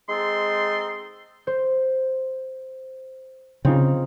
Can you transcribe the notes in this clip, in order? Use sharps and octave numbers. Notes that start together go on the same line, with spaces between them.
G#3 C4 D#4 A4 C6
C5
C#3 C4 D#4 F4